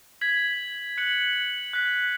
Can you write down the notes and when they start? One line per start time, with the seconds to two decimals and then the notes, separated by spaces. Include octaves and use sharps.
0.21 G#6 B6 F#7
0.98 F#6 C#7 F#7
1.73 F#6 B6 F#7